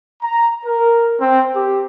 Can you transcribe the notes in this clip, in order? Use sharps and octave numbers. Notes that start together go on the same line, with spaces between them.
A#5
A#4
C4
G4